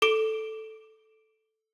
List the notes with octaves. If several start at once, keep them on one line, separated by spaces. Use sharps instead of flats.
A4 D6 D7